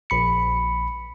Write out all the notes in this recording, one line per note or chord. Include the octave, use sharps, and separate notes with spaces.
A#1 B5 C#7